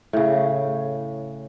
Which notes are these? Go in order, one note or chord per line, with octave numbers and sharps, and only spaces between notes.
A2 C#3